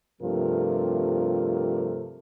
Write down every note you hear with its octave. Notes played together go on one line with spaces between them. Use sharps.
G2 C3 F3 A3 F4 A#4